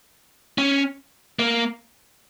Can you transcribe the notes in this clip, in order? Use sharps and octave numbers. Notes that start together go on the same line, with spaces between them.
C#4
A#3